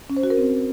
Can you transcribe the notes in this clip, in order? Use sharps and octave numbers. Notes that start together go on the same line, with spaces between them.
C#4
C5
F#4
A#4
C4